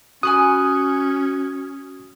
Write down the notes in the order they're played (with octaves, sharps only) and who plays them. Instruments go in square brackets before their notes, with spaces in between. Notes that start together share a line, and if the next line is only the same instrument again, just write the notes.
[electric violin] C#4 [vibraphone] F#4 [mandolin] G#5 B5 C#6 [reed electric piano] D#6